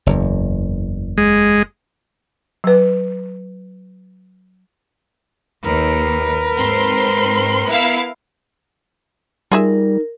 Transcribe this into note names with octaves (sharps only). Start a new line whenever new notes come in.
F#1 E2
G#3
F#3 B4
D#2 A#4 B4
G#2 C4 C6
B3 E4 F5
G3 D#4 F4 G#4 A#4 E5